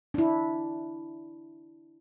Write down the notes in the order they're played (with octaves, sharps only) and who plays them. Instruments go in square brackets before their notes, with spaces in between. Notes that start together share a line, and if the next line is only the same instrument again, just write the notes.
[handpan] D4 E4